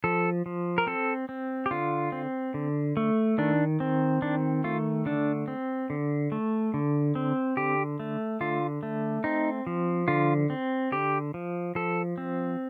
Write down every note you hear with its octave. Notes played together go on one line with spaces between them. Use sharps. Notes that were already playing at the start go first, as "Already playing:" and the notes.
F3 A4
F3
A#4
C4 A4
C4
G4
D3 F4
C4
D3
A3
D#3 D4
C4
D#3 D4
A3 F4
D3 D4
C4
D3
A3
D3
C4
D3 G4
A3
D3 F4
A3
C4 D#4
F3
D3 F4
C4
D3 G4
F3
F3 A4
C4